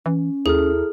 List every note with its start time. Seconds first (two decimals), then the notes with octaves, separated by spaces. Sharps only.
0.06 E3 C#4
0.46 D#2 E4 G#4 A4 F6